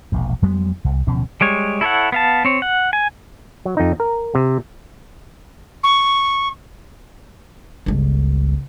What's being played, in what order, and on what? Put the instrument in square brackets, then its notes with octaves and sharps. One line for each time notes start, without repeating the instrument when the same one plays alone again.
[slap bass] E1 A#1 E2
F2 F#3 G#3 B3
C2
D1 B2 F3 C#4
[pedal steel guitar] G3 G#3 C#5
E4 A4 C#5 F#5
B3 F5 A5
C4 C#5
F#5
G#5
[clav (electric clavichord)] F#3
F2 D#4
A#4
C3
[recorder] C#6
[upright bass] G1 C#2